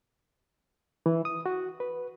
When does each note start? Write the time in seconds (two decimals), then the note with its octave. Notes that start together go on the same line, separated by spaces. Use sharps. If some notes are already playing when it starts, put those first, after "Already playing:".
1.06 E3
1.25 D#6
1.46 F#4
1.80 B4